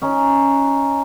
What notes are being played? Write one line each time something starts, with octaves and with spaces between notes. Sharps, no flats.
C#4 D#4